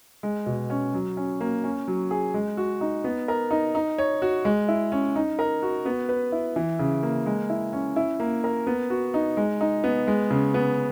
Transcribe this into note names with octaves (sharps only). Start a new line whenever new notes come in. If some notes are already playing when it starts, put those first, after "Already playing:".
G#3
B2
C#4
F#3
C#4
A#3
C#4
F#3
G#4
G#3
F#4
D#4
B3
A#4
D#4
D#4
C#5
F#4
G#3
E4
C#4
D#4
A#4
F#4
B3
B4
E4
E3
C#3
A#3
G#3
E4
C#4
E4
A#3
A#4
B3
F#4
D#4
G#3
D#4
B3
G#3
C#3
B3